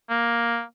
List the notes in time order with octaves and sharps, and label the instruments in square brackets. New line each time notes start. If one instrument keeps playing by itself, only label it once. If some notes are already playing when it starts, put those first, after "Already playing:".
[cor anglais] A#3